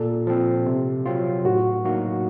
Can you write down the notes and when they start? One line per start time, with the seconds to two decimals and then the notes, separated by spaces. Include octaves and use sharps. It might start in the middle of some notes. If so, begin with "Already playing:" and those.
Already playing: A#2 A4
0.27 F3 C4
0.66 C3
1.06 F#3 C4 F4
1.45 A2 F#4
1.84 F#3 A#3 D#4 F#4